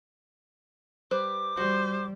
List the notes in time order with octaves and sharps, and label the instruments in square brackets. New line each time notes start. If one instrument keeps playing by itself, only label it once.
[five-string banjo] G3 B4 C5 [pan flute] D6
[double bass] G3 [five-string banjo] F#4 [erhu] C5